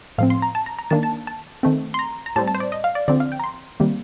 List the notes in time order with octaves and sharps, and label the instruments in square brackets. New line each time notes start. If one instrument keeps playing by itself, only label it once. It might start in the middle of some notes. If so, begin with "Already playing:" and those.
[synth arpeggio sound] A2 F3 C4 F5
C6
A#5
A5
A#5
A#5
D#3 A#3 D4 A5
A5
A5
D#3 A3 C4
C6
A#5
A#5
A2 G3 C4 A5
A5
C5
D5
D#5
F5
D5
D3 F3 C4 D5
F5
G5
A#5
C6
C3 D#3 G3 A#3